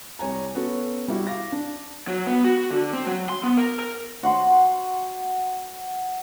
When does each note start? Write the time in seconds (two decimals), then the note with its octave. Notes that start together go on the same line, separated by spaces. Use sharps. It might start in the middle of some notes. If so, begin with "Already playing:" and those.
0.19 C2 G3 C#5 G#5 A#5
0.55 B3 C#4 F#4 A4
1.08 G3 E4 F#4
1.27 F5 D6 A#6
1.52 D4
2.08 F#3
2.26 B3
2.44 F#4
2.71 D3
2.94 C4
3.07 F#3
3.29 C6
3.43 B3
3.57 A#4
3.79 A#4
4.23 F#4 F#5 C6